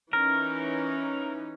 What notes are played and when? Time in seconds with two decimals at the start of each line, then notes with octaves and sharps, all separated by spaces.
0.13 E3 C#4 D#4 A#4